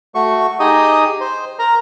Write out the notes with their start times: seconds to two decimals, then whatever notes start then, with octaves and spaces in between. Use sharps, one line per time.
0.15 A3 F#4 C#6
0.60 D#4 G4 G#4 D#5 D#6
1.20 C5
1.59 A#4 A#5